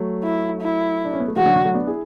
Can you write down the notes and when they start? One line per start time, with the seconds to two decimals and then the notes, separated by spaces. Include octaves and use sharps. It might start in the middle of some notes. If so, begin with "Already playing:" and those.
Already playing: F#3 A3
0.23 E4
0.62 E4
1.05 D4
1.13 C#4
1.20 B3
1.28 A3
1.36 E3 G#3 F#4
1.45 D3 F#3
1.56 D3
1.64 F#3 A3
1.74 B3 D4
1.87 E4 G#4